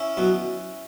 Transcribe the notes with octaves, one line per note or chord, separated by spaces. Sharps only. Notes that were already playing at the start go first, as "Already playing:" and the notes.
Already playing: C#4 E4
B2 F#3 B3